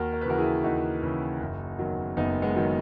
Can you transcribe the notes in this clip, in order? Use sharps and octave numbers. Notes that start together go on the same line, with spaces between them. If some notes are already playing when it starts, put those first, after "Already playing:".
Already playing: D#2 F#4 A#4
A#4
B4
C#3 E3 F#4 A#4
E4 G#4
D#2 D#4 F#4
C#3 E3
F#1
E2 D#3 F#3
F#1 B3 D#4
G#3 B3
D#3 F#3